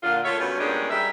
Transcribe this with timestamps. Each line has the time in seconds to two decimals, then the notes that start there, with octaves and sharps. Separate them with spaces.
0.03 A#2 D3 F4
0.24 A3 F4 A4 C#5 E5
0.38 G2 B2 F#3 C#4
0.59 G2 A#2 G3 G#3 C#4 D4
0.90 G3 D#4 G#4 E5